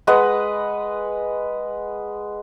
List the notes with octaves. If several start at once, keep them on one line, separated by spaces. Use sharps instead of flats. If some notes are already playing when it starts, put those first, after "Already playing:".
G#3 B4 D#5 F#5